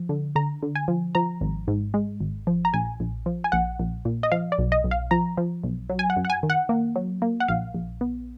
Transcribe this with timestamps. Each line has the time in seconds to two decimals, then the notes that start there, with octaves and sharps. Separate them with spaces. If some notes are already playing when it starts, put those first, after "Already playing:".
Already playing: F3
0.09 D3
0.36 D3 A#5
0.63 D3
0.76 G#5
0.88 F3
1.15 F3 A#5
1.41 G#1
1.68 G#2
1.94 G#3
2.20 G#1
2.47 F3
2.65 A#5
2.73 A#1 G#5
3.00 A#1
3.26 F3
3.44 G#5
3.52 A#1 F#5
3.79 A#1
4.05 A#2
4.23 D#5
4.32 F3 F5
4.52 D5
4.58 B1
4.72 D#5
4.84 B1
4.91 F5
5.11 F3 A#5
5.38 F3
5.63 B1
5.90 F#3
5.99 G#5
6.10 F#5
6.17 F#2
6.25 F#5
6.30 G#5
6.43 D#3
6.50 F#5
6.69 A#3
6.96 F#3
7.22 A#3
7.40 F#5
7.48 A#1 F5
7.74 A#1
8.01 B3